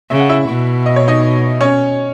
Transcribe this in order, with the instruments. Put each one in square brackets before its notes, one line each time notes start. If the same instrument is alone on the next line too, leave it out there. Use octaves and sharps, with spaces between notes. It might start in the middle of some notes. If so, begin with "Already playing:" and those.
[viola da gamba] C#3 [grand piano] E5
[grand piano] F#5
E4 E5
[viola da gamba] B2
[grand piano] D#5
C#5
D#4 D#5
C#4 C#5